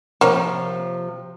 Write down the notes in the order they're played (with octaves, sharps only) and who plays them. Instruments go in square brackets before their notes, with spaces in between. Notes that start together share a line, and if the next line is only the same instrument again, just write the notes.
[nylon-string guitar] C3 F3 [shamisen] A#3 C#5